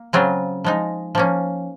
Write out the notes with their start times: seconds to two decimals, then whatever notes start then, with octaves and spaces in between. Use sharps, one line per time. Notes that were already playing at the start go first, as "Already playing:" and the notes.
Already playing: A#3
0.13 C#3 F#3 C4 F4 G#4
0.64 F3 G#3 D#4
1.15 F3 A#3 C#4